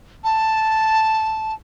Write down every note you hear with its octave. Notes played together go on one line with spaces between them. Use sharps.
A5